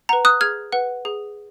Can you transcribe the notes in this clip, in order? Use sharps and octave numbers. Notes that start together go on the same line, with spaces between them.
B4 F#5 A#5
D#6 F#6
G#4 F6 G#6
B4 F#5
G#4